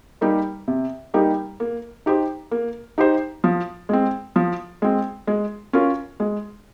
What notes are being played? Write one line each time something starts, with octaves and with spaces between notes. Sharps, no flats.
G3 A#3 D#4 G4
C3
G3 A#3 D#4 G4
A#3
D#4 G4 C5
A#3
D#4 G4 C5
F3
G#3 C4
F3
G#3 C4
G#3
C#4 F4 A#4
G#3